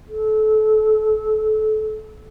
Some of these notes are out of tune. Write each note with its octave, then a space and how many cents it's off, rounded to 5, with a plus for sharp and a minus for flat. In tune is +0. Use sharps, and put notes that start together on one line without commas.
A4 -25